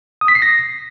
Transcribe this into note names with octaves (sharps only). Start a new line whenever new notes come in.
D#6
B6
C7
A#6